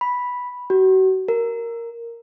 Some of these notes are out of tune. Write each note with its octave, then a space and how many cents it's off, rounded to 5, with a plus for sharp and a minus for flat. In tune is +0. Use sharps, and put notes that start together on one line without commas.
B5 -5
F#4 +35
A#4 -5